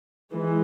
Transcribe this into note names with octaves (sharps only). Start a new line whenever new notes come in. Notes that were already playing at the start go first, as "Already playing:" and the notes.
E3 G#3